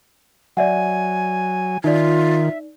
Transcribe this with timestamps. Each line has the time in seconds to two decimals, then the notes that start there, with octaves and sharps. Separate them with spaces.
0.57 F#3 D5 E5 F#5 G#5
1.84 D#3 D#4 F4 D5 E5